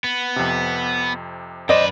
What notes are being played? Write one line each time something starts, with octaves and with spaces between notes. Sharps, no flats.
B3
F2 C3
F#2 B4 C5 D5 D#5